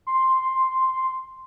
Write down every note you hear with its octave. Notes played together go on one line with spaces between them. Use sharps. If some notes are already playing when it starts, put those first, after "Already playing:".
C6